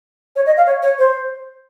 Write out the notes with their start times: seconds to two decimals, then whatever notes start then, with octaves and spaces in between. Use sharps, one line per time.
0.36 C#5
0.46 D#5
0.57 F5
0.66 C#5
0.82 C#5
0.98 C5